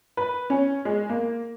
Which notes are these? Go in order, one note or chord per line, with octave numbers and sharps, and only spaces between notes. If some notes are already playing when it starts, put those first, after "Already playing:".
B4
C#4
G#3
A#3